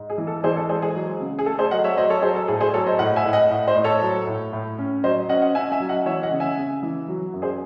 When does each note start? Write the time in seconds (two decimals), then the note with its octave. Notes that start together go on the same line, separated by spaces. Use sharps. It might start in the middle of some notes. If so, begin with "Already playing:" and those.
Already playing: G#2
0.10 G#4
0.18 E3
0.27 A4
0.44 E3 G#4 C5
0.56 A4
0.69 G#3 G#4 C5
0.82 G#4
0.95 F#3
1.20 C#3
1.39 G#4
1.46 A3 A4
1.59 G#4 C5
1.71 F#3 D#5 F#5
1.84 C#5 E5
1.97 F#3 C5 D#5
2.10 A4 C#5
2.22 F#3 G#4 C5
2.35 A4
2.48 A2 G#4
2.61 G#4 C5
2.74 F#3 A4 C#5
2.87 C5 D#5
2.99 A2 D#5 F#5
3.16 E5 G#5
3.25 A2
3.33 D#5 F#5
3.50 A2
3.67 C5 D#5
3.76 A2
3.84 A4 C#5
4.02 F#3
4.27 A2
4.53 A2
4.78 C#4
5.04 F#3 C5 D#5
5.29 C#4 D#5 F#5
5.42 D#5 F#5
5.55 C#4 E5 G#5
5.72 E5 G#5
5.80 F#3
5.89 D#5 F#5
6.06 E3 C#5 E5
6.23 D#5 F#5
6.31 C#3
6.40 E5 G#5
6.57 C#3
6.83 E3
7.08 F#3
7.34 F#2
7.42 G#4 C5